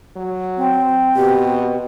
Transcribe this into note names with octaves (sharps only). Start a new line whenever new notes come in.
F#3
C4
B2 G4